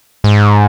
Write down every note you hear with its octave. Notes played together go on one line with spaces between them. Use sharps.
G#2